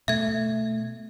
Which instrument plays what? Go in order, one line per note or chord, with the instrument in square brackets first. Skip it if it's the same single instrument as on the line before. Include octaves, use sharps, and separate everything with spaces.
[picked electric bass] B2 A3 [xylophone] E5 G#6